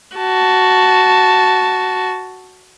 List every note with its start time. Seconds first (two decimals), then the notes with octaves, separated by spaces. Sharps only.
0.17 F#4 A5